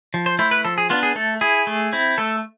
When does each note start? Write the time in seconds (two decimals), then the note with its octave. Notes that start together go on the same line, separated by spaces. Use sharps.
0.14 F3
0.26 C5
0.39 A3 E4 C5
0.51 B4
0.65 F3 A4
0.78 G#4
0.90 B3 D4 F4
1.03 G#4
1.16 A3 A4
1.41 E4 G#4
1.67 A3
1.93 C4 E4
2.18 A3 A4